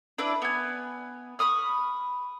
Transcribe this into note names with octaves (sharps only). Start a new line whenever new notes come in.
D4 E4 B4 D5
B3 G#5
B5 C#6 D#6 F6